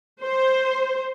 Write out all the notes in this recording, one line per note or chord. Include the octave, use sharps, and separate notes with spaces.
C5